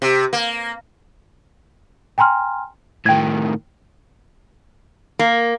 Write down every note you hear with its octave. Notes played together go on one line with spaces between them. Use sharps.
C3
A#3
G5 G#5 A#5 C6 F6
A2 D#3 G5 G#6
A#3